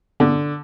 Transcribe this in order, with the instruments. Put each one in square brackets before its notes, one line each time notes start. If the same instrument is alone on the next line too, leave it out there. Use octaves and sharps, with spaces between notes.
[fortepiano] D3